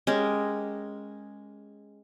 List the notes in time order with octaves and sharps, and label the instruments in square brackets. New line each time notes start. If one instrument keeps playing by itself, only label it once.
[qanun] G#3 C#4 G4 A#4